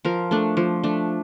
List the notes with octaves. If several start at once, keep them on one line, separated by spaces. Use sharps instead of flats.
F3 A#4
A3 D4
F3
A3 D4